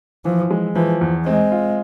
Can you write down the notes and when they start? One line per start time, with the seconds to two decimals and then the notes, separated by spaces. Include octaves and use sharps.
0.25 E3 F3
0.51 G#3
0.75 E3 F3
1.01 E2
1.26 G#3 C4
1.52 F4